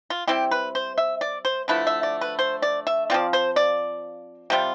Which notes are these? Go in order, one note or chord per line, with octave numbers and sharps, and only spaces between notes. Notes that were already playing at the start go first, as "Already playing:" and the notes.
F4
G3 C4 E4 G4
B4
C5
E5
D5
C5
D3 F3 A3 E4 B4
E5
D5
B4
C5
D5
E5
F3 C4 F4 D5
C5
D5
C3 G3 C4 F4